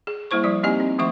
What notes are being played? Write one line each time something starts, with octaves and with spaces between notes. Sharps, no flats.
G#4
G3 A#3 E4 C5 C#6
F3 G3 D5
A#3 C4 D#4 G4 D#5 G#5
C4
D#3 F3 A3 E5 C#6